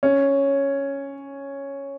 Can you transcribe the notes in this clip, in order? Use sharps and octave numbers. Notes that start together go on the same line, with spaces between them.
C#4